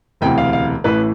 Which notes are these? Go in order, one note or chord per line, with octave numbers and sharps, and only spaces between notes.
E1 D2 C3 E3 G5
F5
F5
A1 A2 E3 B4